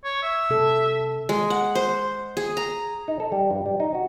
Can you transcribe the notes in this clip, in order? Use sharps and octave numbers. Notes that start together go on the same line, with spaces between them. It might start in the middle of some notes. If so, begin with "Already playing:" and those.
C#5
E5
C3 A4
G#3
F#5
C5
G#4
A#5
D#4
A4
G3
G2
G3
D#4
F#4